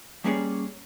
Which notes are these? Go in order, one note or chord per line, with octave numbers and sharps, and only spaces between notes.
G3 A#3 C#4 G#4 C#5 D5